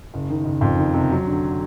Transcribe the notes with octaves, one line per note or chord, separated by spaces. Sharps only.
F#1
D#3
F#1
F2
D#3
C3
F#3
D3